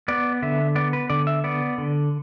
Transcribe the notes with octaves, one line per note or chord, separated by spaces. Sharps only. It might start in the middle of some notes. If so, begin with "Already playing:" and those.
B3 D5
D3 E5
B3 D5
B4
D3 D5
E5
B3 D5
D3